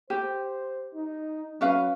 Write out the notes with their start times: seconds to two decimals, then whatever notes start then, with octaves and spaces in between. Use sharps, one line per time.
0.10 G4 C5
0.95 D#4
1.61 F#3 C#4 B4 F5